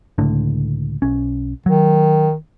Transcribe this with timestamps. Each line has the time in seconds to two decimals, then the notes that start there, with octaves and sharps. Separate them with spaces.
0.18 C#2 A2 D3
1.02 B1 C#4
1.66 D#3 F#3